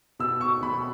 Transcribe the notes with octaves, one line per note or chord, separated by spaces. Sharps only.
B2 E6
C#6
B2 B5